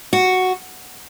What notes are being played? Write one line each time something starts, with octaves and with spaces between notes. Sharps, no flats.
F#4